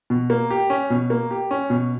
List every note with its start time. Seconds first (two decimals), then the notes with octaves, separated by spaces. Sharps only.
0.10 B2
0.30 A#3
0.50 G4
0.70 C#4
0.90 B2
1.10 A#3
1.31 G4
1.51 C#4
1.70 B2